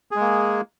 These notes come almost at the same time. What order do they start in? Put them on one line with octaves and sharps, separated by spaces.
G#4 G#3 A#3